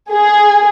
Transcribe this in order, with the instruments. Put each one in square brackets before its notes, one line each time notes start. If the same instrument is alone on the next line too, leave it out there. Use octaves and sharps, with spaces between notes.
[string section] G#4